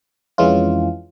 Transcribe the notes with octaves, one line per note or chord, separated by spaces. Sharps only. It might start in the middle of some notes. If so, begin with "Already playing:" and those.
F2 E3 G#3 C#4 F4